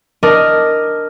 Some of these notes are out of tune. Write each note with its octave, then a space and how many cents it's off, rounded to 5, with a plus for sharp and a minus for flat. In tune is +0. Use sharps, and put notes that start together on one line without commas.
D4 +0 A#4 +0 D#5 +0